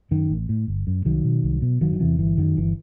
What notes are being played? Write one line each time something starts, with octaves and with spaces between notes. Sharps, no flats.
F#2 D#3
A1
A2
G1
F#2
C2 D#3 F#3
B2
C2
B2
F#1 D#3 F#3
D#3
E2 C3 E3
G1 E3
F#2 D#3 F#3
G1 E3